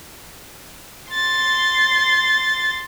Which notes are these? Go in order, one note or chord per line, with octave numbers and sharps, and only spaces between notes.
C6 A6